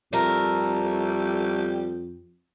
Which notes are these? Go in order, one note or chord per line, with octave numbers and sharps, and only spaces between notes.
F2 G3 A3 A#4